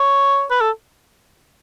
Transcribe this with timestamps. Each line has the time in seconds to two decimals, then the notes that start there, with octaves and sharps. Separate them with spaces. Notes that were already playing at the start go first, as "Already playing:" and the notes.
Already playing: C#5
0.51 B4
0.61 A4